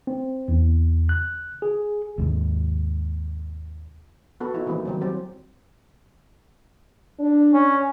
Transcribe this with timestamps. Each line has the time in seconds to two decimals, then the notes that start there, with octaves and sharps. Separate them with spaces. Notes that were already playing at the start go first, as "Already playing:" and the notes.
0.07 C4
0.48 E2
1.09 F#6
1.62 G#4
2.18 D#2 G#2 C3
4.40 B3 F#4 A4
4.54 F3 D#4 E4 F#4
4.66 D#3 E3 G3 A#3 C4 D#4
4.85 D#3 F#3 G3 C4
5.01 D#3 F#3 C4 G4
7.20 D4
7.53 C#4